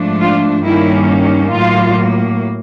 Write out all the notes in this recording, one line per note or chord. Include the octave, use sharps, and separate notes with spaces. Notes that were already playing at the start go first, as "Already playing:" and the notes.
Already playing: G#2 F3 A3 D4
F4
G2 D#3 G3 A#3 C#4 E4
A2 F#3 A#3 F4